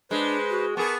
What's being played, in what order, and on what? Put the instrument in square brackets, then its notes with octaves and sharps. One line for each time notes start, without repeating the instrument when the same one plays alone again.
[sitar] G#3 [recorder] D4 [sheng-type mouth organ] B4 C5
[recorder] F#4
[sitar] B3 G#4 [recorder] A#4 [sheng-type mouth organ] A5 C#6 D6